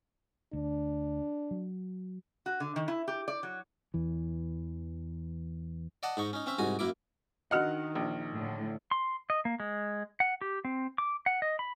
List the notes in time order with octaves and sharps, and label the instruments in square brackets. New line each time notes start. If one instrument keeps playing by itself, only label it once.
[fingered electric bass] D2 [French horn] D4
[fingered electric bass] F#3
[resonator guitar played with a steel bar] F#4
D3
D#3
E4
G4
D5
F#3
[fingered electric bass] E2 E3
[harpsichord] D5 D#5 F#5 A5
G#2 D#4 C#6
C#4 D#4
C4 C#4 E5
C2 G#2 F#4 G#5
F#2 A#3 E4 D6
[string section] D#3 [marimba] D4 F#4 D#5 [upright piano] F#5 F6
[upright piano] A#1
[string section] A2 D3
[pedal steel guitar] C6
D#5
A#3
G#3
F#5
G4
C4
D6
F#5
D#5
B5